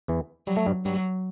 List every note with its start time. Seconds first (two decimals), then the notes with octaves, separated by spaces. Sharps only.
0.08 E2 E3
0.47 F#3 G3
0.57 A3
0.66 G2 G3
0.85 G2 F#3 G3